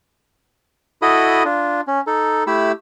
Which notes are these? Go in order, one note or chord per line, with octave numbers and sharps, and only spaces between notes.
E4 F#4 A4 D#5 B5 D#6
D4 F4
C#4
D#4 A4
A3 E4 G4 B5 E6